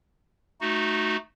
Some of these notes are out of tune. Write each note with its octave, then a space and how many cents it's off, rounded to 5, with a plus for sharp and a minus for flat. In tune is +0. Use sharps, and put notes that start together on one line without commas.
A3 -10 D#4 +0 F#4 +0